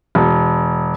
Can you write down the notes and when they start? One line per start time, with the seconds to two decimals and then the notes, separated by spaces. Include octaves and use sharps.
0.15 E1